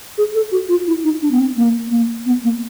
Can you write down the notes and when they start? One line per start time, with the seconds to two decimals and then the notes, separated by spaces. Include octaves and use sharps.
0.18 G#4
0.35 A4
0.52 F#4
0.69 F4
0.87 E4
1.04 D#4
1.22 D4
1.31 B3
1.39 C4
1.57 A#3
1.91 A#3
2.26 B3
2.44 A#3